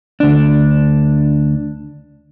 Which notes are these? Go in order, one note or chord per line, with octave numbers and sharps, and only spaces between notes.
D2 D4